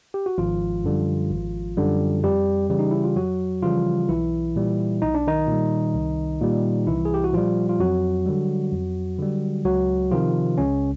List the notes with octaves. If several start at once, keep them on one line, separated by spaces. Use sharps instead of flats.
G4
F#4
G#1 F3 F4
F#2 D3 G3
G#1
F#2 D3 G3
F2 G3 G4
C#3 E3 G3
D#4
E4
F4
F2 F#3 F#4
C#3 E3 F3 G3 F4
B1 E3 E4
A#2 G3
B1 D#4
D4
D#3 D#4
A#2 G3
C2
A#2 G3
C2 E3 E4
G#4
G4
F#4
A#2 F3 G3 F4
F4
F2 F#3 F#4
D3 G3
F2
D3 G3
C#2 F#3 F#4
C3 D#3 F3 F4
C#2 C#3 C#4